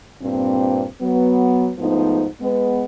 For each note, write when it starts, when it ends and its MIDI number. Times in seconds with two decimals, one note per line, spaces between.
0.22 0.85 43
0.22 0.85 46
0.22 0.85 60
1.01 1.71 54
1.01 1.71 59
1.79 2.26 44
1.79 2.26 53
1.79 2.26 57
1.79 2.26 59
1.79 2.26 63
2.41 2.85 56
2.41 2.85 59